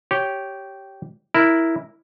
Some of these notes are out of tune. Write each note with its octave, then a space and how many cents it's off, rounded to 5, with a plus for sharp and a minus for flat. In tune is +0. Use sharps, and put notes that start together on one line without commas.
G4 -10 C#5 +0
E4 -5 A#4 +0